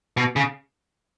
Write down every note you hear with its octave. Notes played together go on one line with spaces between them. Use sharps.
B2
C#3